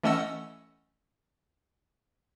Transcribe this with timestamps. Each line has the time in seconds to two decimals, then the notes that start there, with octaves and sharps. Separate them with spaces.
0.03 E3 A3 C#4 D#5 F#5 E6